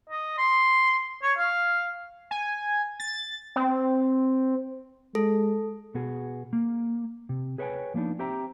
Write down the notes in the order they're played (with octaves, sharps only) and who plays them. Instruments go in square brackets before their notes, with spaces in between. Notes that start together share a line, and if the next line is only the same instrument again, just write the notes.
[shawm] D#5
C6
C#5
F5
[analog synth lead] G#5
A6
C4
[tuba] G#3 [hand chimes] A4
[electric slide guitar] B2 B3 F#4 G#4
A#3
C3
G#4 B4 C#5 E5 G5 G#5
F3 A#3 B3 D4 D#4
C4 G4 C5 E5 G5 A#5